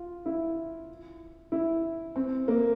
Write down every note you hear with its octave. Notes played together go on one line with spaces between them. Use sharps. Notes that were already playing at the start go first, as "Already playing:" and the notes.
Already playing: F4
E4
E4
C4
A#3